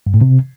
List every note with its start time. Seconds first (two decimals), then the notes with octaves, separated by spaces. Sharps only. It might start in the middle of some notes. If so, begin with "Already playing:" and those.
0.06 G2
0.14 A2
0.21 C3